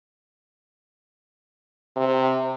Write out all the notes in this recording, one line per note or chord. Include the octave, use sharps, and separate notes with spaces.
C3